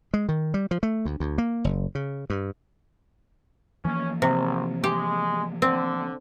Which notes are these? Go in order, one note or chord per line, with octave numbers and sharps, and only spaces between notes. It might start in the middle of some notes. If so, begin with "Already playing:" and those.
G#3
D#3
G3
F3
A3
D2
D2
A#3
F#1
C#3
G2
E3 F3 A#3 C#4
G#1 C3
G#3 G4
D3 C4